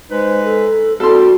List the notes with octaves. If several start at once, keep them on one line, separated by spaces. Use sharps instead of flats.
G#3 D#4 B4 C5
A4
G3 C4 F#4 A4 C6